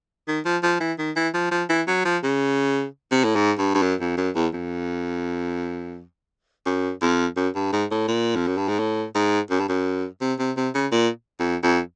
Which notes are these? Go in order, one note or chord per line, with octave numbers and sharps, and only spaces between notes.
D#3
F3
F3
E3
D#3
E3
F3
F3
E3
F#3
F3
C#3
C3
A2
G#2
G2
G2
F#2
F2
F#2
E2
F2
F#2
F2
F#2
G2
G#2
A2
A#2
F2
F#2
G2
G#2
A2
G#2
F#2
G2
F#2
C3
C3
C3
C#3
A#2
F2
F2